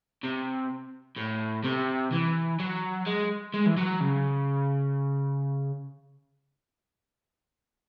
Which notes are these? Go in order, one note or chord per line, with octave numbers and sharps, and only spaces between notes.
C3
A2
C3
E3
F#3
G#3
G#3
E3
F#3
C#3